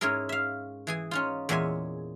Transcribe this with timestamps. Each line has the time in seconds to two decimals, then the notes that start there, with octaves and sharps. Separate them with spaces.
0.01 G#2 C#4 E4 G#4 A#4
0.29 E5 F5
0.87 E3 G#4 G#5
1.11 C#4 D#4 F4
1.49 E2 A#2 G#3 C#5 E5 G#5